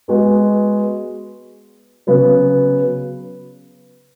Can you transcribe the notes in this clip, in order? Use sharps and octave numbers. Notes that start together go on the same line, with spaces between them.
G#3 B3 F#4
C#3 F#3 B3